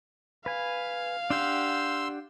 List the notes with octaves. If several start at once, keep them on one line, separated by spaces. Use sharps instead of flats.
B4 F5 G#5
D4 G4 F#5 C6 E6